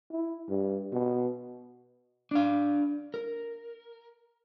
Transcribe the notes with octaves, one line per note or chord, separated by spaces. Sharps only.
E4
G2
B2
D4 F5
A#4